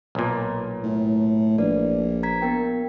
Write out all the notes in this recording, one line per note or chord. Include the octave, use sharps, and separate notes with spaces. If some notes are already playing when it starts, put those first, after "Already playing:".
B1 A#2
A2
A#1 B4 D5
A#5 G#6 B6
B3 A#4 G5